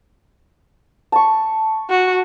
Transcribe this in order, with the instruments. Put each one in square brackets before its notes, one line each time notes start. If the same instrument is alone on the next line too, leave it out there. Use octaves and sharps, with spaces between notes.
[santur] A5 C#6
[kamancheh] F#4